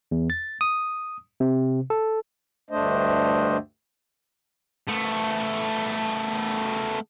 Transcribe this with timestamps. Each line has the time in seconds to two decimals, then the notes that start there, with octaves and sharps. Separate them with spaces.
0.11 E2
0.30 A6
0.61 D#6
1.40 C3
1.90 A4
2.70 D2 G2 A3 D4 C5 D#5
4.87 A3 B3